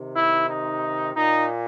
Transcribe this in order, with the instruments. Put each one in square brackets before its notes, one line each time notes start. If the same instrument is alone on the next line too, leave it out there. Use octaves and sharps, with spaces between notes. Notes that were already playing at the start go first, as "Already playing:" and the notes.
Already playing: [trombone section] C3 D#3
E4
D#4
A#2 D#4